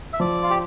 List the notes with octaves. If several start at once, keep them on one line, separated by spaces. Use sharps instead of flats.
E5
F3 D5
F4
G4